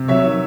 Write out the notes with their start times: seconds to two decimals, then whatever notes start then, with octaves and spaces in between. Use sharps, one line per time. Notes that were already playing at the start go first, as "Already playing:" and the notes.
Already playing: C3
0.08 F#3 C#5 E5
0.24 D#3